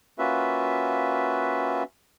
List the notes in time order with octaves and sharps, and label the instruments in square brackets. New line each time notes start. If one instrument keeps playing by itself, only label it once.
[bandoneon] A#3 C#4 F4 F#4 B4 E5